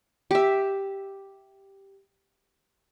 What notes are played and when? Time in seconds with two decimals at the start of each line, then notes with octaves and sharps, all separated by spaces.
0.31 G4 E5